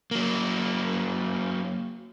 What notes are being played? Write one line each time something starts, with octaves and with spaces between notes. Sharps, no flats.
F#3 A#3